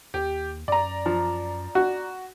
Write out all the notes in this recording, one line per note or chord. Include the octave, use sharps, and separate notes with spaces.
D#2 G4
F#2 D5 A#5
F3
F#4